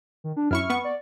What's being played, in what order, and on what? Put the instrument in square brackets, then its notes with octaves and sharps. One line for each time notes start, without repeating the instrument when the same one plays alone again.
[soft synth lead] D#3
D4
[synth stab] F#2 E4 C#6 [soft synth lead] F6
[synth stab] B3 C#6
[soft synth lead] D5